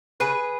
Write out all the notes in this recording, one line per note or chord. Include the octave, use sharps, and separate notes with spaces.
C#3 G#4 B4